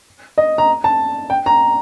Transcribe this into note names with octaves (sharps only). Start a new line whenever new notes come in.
D#5
A#5
A5
G5
A#5